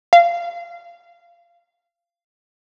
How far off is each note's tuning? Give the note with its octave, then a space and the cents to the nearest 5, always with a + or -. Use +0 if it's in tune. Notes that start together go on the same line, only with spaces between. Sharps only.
F5 -15